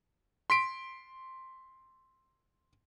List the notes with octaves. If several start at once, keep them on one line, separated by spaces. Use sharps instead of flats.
C6 B6 D7